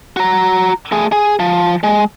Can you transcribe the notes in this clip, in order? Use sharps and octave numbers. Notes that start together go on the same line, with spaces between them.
F#4 A#5
A3 G#4
G#4
F3
G#3